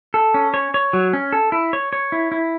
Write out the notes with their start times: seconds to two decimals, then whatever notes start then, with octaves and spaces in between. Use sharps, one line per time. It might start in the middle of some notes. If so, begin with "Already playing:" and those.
0.14 A4
0.34 C#4
0.54 C#5
0.74 C#5
0.93 F#3
1.13 C#4
1.33 A4
1.52 E4
1.73 C#5
1.93 C#5
2.12 E4
2.32 E4